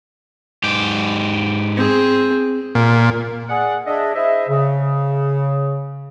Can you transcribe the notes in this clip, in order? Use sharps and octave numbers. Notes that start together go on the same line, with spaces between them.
G#2 G4
C4 G#4
A#2
G#4 D5 F#5
D4 G#4 D#5 E5
E4 G#4 C5 D#5 E5
C#3